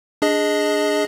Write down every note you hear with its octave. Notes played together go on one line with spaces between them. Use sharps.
D4 G#4 D#5